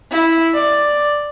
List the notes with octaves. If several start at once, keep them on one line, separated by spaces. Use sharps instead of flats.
E4
D5